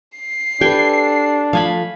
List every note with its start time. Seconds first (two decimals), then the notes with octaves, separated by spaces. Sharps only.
0.17 C7
0.61 D4 G4 A4 B4 G5 G#5
1.53 F3 A3 F5 G#5 A5 B5